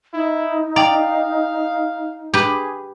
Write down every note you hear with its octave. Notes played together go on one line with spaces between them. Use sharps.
D#4 E4
D5 F5 G5 A#5
G4 G#4 B4